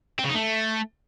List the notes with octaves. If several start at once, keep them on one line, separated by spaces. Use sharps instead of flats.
C4
C#3
D#4
A3